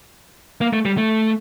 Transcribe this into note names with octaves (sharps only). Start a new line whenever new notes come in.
A#3
A3
G3
A3